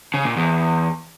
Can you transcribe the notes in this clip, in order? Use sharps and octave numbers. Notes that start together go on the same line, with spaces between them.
C#3
A#2
E2